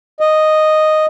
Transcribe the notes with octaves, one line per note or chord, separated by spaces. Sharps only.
D#5